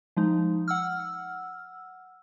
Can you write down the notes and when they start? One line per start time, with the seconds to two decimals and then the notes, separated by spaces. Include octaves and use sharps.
0.17 F3 G#3 D#4
0.68 F#5 E6 F6